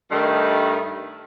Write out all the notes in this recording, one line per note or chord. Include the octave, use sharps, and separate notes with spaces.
G2 D#3 A3